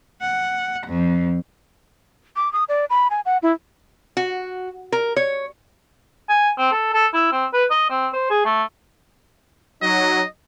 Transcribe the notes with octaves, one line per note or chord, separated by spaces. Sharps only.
F#5
F2
D6
D#6
D5
B5
G#5
F#5
E4
F#4
A#4
C#5
G#5
C4
A4
A4
E4
C4
B4
D#5
C4
C5
G#4
A3
F#3 D#4 D#5